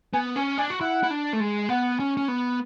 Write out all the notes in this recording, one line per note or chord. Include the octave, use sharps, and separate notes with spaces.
B3 G#5
C#4 G#5
D4 G#5
F#4
E4 F#5
E4
D4
A3
G#3
B3 F#5
C#4
C#4
B3